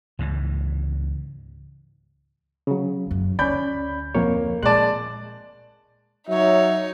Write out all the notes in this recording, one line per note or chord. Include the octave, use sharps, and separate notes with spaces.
C#2 G#2 E3
C#3 F#3
F1 F#2
D2 C#4 D5 B5 G6
F2 A#2 A#3 C#5
A#2 G#3 D5 A5 F#6
F#3 D#4 C#5 E5